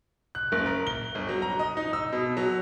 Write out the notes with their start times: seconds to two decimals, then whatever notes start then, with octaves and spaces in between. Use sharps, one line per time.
0.35 F#6
0.52 F#1
0.66 A#4
0.87 G7
1.15 G1
1.29 F#3
1.42 A#5
1.59 D#5
1.77 D#4
1.93 E6
2.12 B2
2.37 F#3